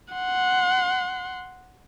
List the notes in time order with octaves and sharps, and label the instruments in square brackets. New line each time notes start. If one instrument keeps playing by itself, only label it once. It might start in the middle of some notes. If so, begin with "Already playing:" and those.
[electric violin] F#5 C6